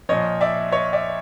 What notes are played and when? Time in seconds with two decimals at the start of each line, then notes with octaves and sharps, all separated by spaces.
0.09 A#2 F3 C#5 D#5
0.41 D5 E5
0.72 C#5 D#5
0.93 D5 E5